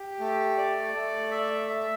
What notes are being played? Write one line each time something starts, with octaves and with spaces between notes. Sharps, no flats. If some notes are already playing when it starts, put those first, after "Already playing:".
Already playing: G4
A3
D5
A3
E5
E5